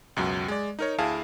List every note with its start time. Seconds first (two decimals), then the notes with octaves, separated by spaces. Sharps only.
0.17 C#2 F#2 B2 F#3
0.48 G#3 D5
0.79 D#4 A#4 C#5
0.99 D2 E4 G#4 F5 A5